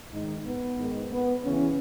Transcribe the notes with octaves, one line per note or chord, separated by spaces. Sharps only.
G#2 D#3 D#4
B3
G#2 D#3
B3
E2 C#3 E3 C#4